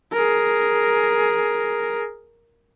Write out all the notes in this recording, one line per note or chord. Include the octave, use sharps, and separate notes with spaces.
G#4 A#4